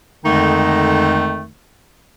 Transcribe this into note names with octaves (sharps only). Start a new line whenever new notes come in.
F2 D3 D#3 G#3 A3 D#4